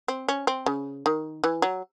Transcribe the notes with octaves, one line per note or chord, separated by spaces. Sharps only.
C4
C#4
C4
C#3
D#3
E3
F#3